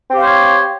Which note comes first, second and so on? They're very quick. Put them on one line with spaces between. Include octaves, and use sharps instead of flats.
C4 G4 F5 C5 C#5